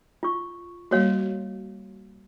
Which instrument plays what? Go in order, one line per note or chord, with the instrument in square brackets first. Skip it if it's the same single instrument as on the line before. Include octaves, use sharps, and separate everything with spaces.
[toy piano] F4 C#6
[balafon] G3 A#3 [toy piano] F#4 C#5 F5